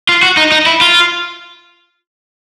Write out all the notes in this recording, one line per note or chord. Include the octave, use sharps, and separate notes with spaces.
F4
F#4
D#4
D#4
E4
F4